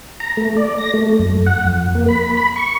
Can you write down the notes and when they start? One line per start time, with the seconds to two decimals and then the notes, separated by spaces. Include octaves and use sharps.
0.20 A#5
0.37 A3
0.57 D5
0.78 A#6
0.94 A3
1.19 F#2
1.46 F#5
1.65 F2
1.95 A#3
2.09 B5
2.37 B5
2.56 C#6